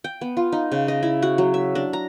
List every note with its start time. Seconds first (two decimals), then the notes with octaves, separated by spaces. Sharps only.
0.04 G5
0.21 B3
0.37 F4
0.52 D#4
0.72 C#3
0.88 D#5
1.03 E4
1.22 F#4
1.38 F#3
1.54 E5
1.75 D4
1.93 A#5